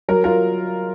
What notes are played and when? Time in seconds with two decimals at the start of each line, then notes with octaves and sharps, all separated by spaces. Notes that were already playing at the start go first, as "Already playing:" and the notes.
0.08 F#3 A#4
0.24 F4 A#4